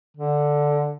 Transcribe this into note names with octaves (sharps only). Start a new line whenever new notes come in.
D3